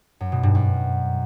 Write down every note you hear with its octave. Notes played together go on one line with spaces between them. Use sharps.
F#2
B2
G2
F#2